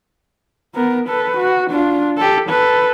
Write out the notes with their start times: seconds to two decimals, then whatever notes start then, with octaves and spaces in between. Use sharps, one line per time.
0.75 B3 A#4
1.08 A4 B4
1.37 F#4
1.70 D4 F4
2.17 G4 A4
2.49 A4 B4